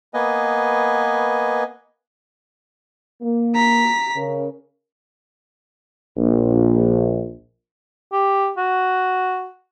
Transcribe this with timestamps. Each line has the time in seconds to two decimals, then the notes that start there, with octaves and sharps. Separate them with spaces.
0.14 A#3 B3 B4 D#5 G#5
3.21 A#3
3.55 A#5 B6
4.16 C#3 A#4
6.17 A#1
8.12 G4
8.57 F#4